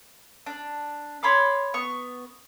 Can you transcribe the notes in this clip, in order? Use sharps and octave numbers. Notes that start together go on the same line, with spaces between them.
D4
C#5 B5 C6 D6
B3 C#6